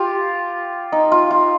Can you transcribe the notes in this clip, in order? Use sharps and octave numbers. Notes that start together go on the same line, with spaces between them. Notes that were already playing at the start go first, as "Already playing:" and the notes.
Already playing: F4 G4
D#4
F4
F4